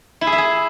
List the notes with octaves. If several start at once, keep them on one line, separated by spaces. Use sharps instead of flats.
E4
G#4
E5
G#4